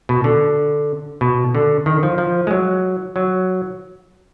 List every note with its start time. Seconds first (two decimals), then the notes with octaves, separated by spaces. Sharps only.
0.09 B2
0.24 D3
1.21 B2
1.55 D3
1.86 D#3
2.03 F3
2.18 F3
2.47 G#3
2.51 F#3
3.16 F#3